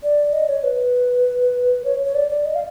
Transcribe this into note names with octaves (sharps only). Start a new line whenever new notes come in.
D5
D#5
C#5
B4
C#5
C#5
D5
D5
D#5
F5